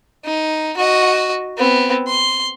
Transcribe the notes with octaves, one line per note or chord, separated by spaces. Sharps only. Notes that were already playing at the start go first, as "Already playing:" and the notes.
D#4
F#4 D#5
B3 C4
C6